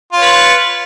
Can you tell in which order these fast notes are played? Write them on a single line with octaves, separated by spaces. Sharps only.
F4 C#5 B4